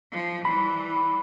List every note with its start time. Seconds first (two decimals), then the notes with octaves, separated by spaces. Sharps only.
0.12 F3
0.45 E3 G3 B5